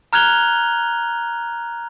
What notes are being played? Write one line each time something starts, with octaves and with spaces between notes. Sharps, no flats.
A#5 F6 F#6 G#6 F7 G7